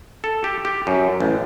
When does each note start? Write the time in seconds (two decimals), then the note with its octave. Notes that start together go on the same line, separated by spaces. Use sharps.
0.24 A4
0.44 G4
0.65 G4
0.87 F#2
1.20 A1